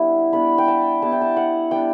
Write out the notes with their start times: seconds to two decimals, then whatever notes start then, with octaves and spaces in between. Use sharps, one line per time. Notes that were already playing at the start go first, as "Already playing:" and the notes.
Already playing: G3 B3 D4 E4
0.33 G3 B3 D4 B5
0.58 G5
0.68 A5
1.02 G3 B3 E4 A5
1.12 G5
1.21 A5
1.37 F#5
1.71 G3 B3 D4 G5